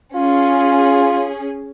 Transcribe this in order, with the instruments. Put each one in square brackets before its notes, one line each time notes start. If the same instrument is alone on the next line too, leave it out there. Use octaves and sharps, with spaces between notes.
[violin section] C#4 G#4 [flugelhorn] F4